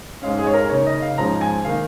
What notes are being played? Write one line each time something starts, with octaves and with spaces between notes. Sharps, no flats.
G#2 G#3 C#4 F5
G#4
C#5
A#4
C#3 A#3 D#4 C#5
D#5
F5
G#2 F3 G#3 C#4 A#5
G#5
D#3 A#3 D#4 F5